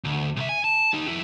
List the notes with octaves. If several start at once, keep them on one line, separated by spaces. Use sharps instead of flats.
D2
C2 E5
G#5
A5
D#4 G4
F2 E4